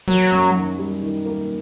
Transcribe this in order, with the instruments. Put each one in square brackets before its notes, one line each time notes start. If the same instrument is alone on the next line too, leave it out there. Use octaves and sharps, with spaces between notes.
[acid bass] F#3 [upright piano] A#3
[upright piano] F#2
D#3
G3
D#3
A#3